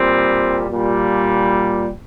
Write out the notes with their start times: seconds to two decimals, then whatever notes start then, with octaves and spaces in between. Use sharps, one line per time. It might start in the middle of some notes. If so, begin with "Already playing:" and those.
Already playing: A#2 G3 C4
0.70 A#2 G3